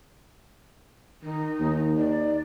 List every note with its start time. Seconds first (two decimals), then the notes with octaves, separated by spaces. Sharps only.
1.23 D#3 D#4
1.60 D#2 D#3
1.97 D#4 D5